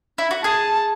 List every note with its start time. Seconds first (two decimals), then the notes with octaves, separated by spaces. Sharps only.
0.18 E4
0.31 F#4
0.44 G#4 A5